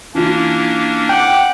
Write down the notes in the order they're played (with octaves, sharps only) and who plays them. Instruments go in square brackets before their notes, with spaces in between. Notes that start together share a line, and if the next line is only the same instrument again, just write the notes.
[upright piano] E3 F4 [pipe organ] A#3 C#4 D4
[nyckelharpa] F#5 D6 [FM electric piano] G5